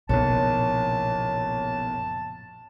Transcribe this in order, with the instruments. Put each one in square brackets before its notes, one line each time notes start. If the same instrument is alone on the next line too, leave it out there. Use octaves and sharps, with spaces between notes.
[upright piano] F#1 B1 [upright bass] A#2 F3 [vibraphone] C#5 [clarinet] A5